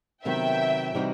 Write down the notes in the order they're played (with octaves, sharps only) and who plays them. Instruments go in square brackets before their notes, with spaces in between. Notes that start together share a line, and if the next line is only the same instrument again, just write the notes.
[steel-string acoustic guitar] C3 D#3 F#3 B3 [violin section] E5 G5
[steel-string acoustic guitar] C3 E3 G3 D#4 F#4